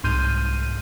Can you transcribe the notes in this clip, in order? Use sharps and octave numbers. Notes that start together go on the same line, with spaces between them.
C2 G#2 C6 F6 G6 D#7